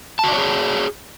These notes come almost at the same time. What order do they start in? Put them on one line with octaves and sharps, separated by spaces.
A5 F#4 D5 C#5 G#4